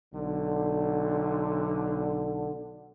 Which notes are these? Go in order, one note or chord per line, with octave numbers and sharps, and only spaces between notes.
B1 D3